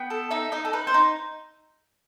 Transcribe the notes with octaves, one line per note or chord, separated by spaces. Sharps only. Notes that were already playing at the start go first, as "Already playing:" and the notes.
Already playing: B3 G5
A4
D#4 E5
D#4 D#5
A4
D#4 B4
C5
D#4